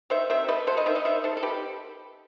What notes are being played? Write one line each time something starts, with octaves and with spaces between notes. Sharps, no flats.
D#3 C5 E5
C3 C5 E5
A3 B4 D#5
F#3 A4 C5
B4 D#5
D#3 C5 E5
B4 D#5
D#3 C5 E5
D#3 A4 C5
A4
B2 G4 B4